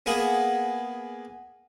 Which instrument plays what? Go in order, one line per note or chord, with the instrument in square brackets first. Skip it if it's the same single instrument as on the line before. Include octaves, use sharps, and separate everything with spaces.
[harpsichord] A#3 B3 G#4 F#5